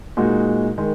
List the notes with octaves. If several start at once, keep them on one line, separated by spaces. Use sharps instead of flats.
A#2 G#3 D#4 F#4
D#3 G#3